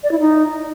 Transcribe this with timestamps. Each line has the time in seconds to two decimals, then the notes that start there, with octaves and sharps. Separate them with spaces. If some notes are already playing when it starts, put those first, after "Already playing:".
0.03 D5
0.11 E4
0.19 D#4